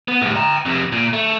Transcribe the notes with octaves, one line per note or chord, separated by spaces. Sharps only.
B3
A2 G3
G5 A#5
F2 C3
A#2
A3